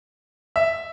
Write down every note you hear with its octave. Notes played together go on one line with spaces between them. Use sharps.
E5